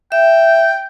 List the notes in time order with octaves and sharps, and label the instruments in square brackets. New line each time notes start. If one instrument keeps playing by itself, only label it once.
[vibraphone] E5 [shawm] G5